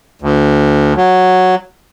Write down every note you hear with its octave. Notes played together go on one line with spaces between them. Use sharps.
D2
F#3